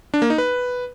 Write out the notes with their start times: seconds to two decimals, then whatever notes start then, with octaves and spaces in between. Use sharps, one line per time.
0.14 D4
0.22 A#3
0.30 D#4
0.38 B4